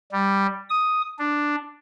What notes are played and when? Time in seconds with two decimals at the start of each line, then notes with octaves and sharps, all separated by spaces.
0.12 G3
0.69 D#6
1.19 D4